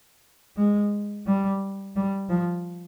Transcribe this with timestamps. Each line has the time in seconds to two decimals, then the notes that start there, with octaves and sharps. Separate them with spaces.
0.57 G#3
1.27 G3
1.96 G3
2.29 F3